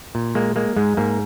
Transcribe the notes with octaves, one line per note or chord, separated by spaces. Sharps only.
A#2
G#3 A#3
G#3 A#3
G#2 G#3
G#2 A#3